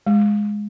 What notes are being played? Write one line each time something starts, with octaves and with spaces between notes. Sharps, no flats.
G#3